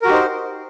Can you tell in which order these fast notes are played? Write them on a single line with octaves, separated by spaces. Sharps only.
A#4 F#4 G4 D#4 C5